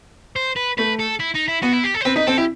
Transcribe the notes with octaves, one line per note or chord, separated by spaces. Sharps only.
C5
B4
A3 B4
A4
E4
D#4
E4
B3 F#4
E4
G4
A4
C5
C4 B4
D#4 B4
C4 A4
E4 G4